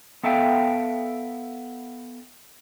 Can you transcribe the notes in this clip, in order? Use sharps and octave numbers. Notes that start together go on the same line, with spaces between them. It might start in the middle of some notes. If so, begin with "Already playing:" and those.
B3 A4 E5 F5 G5